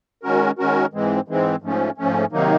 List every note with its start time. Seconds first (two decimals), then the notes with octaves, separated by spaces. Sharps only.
0.23 D#3 G#3 C#4 F#4 A#4
0.59 D#3 G#3 C#4 F#4 A#4
0.93 G#2 E3 G#3 C4
1.28 G#2 E3 G#3 C4
1.62 G#2 F3 A3 C#4
1.98 G#2 F3 A3 C#4
2.32 C3 D#3 F#3 A#3 D#4